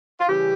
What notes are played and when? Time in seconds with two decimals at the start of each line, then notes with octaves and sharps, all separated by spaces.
0.21 F4
0.28 C#3 E3 G3 C#4 G4